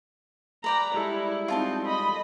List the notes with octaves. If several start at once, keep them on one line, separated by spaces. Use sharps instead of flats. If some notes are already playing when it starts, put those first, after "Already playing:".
B4 D5 G5 A#5
G3 G#3 E4 A4
C4 D#4 F4 A5 C6
D#5 B5